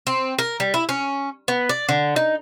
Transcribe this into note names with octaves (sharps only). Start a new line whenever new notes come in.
C4
A#4
G3
E4
C#4
B3
D5
D3
D#4